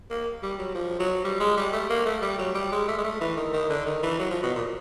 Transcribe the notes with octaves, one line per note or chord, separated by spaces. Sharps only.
A#3
G3
F#3
F3
F#3
G3
G#3
G3
A3
A#3
A3
G3
F#3
G3
G#3
A3
G#3
A3
E3
D#3
D#3
D3
D#3
E3
F#3
F3
B2
A#2